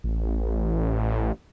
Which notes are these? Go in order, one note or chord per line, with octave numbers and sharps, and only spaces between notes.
A1